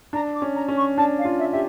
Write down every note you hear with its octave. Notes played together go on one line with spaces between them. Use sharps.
D4 A#5
D6
C#4
A#5
C#4
C#6
D4 A5
F5
F4
E5
G4 E5